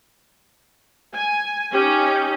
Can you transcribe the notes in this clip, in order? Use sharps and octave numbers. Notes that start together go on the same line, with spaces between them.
G#5
C#4 D#4 G4